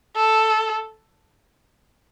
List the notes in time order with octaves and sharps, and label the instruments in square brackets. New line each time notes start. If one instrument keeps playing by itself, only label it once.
[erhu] A4